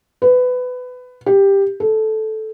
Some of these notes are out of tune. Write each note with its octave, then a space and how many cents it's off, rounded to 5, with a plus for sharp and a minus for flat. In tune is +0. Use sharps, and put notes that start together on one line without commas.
B4 +20
G4 +10
A4 -10